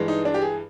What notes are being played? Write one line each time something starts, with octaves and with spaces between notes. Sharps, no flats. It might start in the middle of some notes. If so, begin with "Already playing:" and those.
Already playing: G2 E3 G#3
D#4
D4
G4
G#4